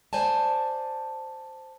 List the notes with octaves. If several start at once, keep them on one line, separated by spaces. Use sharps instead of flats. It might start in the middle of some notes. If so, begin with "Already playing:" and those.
C5 D5 G#5 A5